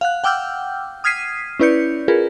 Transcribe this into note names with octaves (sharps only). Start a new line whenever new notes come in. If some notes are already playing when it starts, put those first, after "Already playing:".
F5 F#5 F#6
F#5 G5 D6 E6 F6 G6
D#6 F6 G#6 B6 C7 D#7
C#4 E4 B4 D5 G6 C#7
F4 G#4 A#4 B4